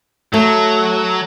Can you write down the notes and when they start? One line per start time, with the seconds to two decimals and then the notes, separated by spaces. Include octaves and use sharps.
0.34 F#3 A3